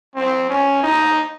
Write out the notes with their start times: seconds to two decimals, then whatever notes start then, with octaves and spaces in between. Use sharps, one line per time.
0.16 C4
0.50 C#4
0.83 D#4